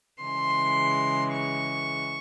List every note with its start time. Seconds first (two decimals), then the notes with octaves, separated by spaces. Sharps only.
0.21 C#3 E3 G#3 C6
1.33 C#6